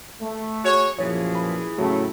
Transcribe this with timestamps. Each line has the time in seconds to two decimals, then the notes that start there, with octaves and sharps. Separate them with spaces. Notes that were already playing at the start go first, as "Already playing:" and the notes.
0.22 A3
0.63 F#4 G#4 C#5
0.99 F#2 A#2 E3 F3 G#4 C#5
1.35 B5
1.78 A2 C#3 F#3 A3